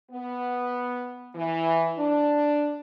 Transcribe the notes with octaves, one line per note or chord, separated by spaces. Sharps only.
B3
E3
D4